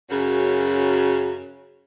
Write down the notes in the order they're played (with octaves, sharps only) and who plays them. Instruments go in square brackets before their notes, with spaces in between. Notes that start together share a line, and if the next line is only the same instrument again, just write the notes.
[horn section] F#2 C#3 F#3